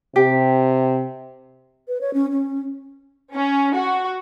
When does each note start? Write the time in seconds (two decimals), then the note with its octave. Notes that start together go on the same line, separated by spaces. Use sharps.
0.16 C3 G4
1.88 B4
2.01 C#5
2.14 C#4
2.31 C#4
3.33 C#4
3.74 F#4